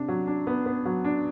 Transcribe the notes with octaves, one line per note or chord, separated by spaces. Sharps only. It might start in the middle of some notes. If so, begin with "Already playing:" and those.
Already playing: C3 D4
F#3
D4
B3
B3
F#3
D4